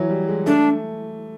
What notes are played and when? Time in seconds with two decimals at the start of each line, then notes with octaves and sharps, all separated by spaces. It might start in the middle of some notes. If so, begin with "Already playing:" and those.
Already playing: E3 F#3
0.10 G3
0.28 G#3
0.46 A3 D4